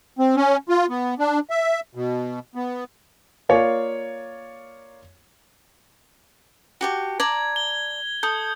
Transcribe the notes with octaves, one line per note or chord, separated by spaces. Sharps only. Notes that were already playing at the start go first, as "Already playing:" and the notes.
C4
C#4
F4
B3
D4
E5
B2
B3
A#3 F4 C#5 D5 F5
F#4 G4 A5
D5 A5 A#5 G#6
G7
A4 D#6 G6